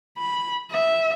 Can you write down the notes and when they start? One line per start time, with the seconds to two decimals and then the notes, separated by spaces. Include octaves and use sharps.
0.18 B5
0.72 E5